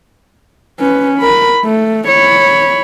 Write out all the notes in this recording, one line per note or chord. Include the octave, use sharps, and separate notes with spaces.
C#4 B4
A#4 B5
A3
C#5 B5